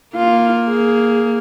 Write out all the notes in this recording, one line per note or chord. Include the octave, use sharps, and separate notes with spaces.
A#3 F4
G#4